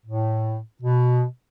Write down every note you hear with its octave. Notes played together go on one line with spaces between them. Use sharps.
A2
B2